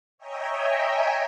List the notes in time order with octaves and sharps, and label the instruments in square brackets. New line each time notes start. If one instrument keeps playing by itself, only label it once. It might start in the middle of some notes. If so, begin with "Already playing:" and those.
[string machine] C#5 D#5 E5 G5 G#5 A#5